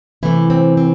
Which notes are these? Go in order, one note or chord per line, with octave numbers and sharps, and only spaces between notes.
C3 E3 A3 E4
C4
C4